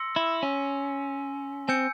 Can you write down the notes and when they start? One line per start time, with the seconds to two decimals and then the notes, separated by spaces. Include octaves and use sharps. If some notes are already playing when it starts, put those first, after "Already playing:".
Already playing: C6 E6 A#6 C#7
0.16 E4
0.43 C#4
1.68 C4 G#5 E6 G6 C#7